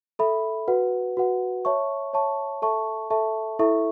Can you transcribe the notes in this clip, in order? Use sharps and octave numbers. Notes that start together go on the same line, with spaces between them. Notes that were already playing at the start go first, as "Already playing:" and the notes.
A4 E5 B5
F#4 B4 F#5
F#4 B4 F#5
C#5 E5 A5 C#6
C#5 E5 A5 C#6
A4 E5 A5 C#6
A4 E5 A5 C#6
E4 A4 E5 C#6